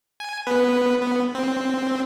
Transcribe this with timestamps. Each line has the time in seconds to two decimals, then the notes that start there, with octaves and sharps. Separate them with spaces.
0.20 G#5
0.47 B3 B4
1.03 B3
1.35 C4